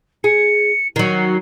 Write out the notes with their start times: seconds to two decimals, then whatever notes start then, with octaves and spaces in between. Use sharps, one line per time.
0.24 G#4 C#7
0.96 D#3 F#3 C7